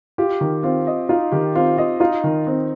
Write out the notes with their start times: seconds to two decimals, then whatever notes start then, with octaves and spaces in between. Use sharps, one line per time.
0.18 F4 G4
0.41 D#3
0.63 C4 F4
0.87 D#5
1.09 D#4 F4
1.32 D#3 G4
1.55 C4 F4
1.77 F4 D#5
2.00 D#4 F4
2.24 D#3
2.47 C4